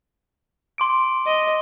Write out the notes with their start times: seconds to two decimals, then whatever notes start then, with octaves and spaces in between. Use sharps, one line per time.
0.78 C6 D6 D7
1.26 D#5